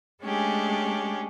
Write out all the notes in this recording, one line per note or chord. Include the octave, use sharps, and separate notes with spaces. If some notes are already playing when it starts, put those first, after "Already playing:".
G#3 A3 C#4 D4 G4 G#4